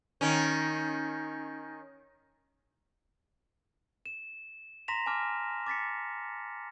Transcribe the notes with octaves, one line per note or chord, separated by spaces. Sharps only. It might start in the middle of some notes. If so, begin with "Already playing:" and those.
D#3 C#4
E7
A#5 C6 A#6 B6 E7 F7
G#5 A5 D6 F6
D6 A6 B6 C#7